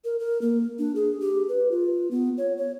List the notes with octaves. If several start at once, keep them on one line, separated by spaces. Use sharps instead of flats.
A#4
A#4
A#3
D4
G#4
G4
B4
F4
B3
C#5
C#5